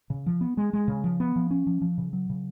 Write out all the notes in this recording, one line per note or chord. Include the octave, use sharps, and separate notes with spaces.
C#3
F3
B3
G#3
G#3
C#3
F3
B3
F3
C#4
F3
F3
C#3
F#3
C#3